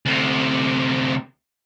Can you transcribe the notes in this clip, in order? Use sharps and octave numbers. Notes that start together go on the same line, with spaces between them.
D2 C3